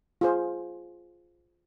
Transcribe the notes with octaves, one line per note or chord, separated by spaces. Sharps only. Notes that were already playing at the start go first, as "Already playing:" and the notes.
F4 G#4 C5